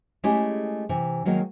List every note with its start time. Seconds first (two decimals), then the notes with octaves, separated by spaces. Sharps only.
0.24 G#3 A3 C#4 E4 G4 G#4
0.89 C3 E3
1.25 D#3 F#3 G#3 A#3